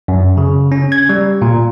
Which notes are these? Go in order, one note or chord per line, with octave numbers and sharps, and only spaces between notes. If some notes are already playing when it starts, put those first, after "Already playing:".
F#2
C#3
C#4
G#6
G3
A#2